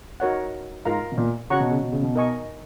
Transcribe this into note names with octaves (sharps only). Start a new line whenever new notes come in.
D#4 F#4 A#4 C#5 F#5
G#2 F4 A#4 F5 A#5
B2
A#2
C#3 F#4 C#5 F#5 A#5 C#6
B2
C#3
B2
C#3
B2
D#4 A#4 D#5 G#5 C#6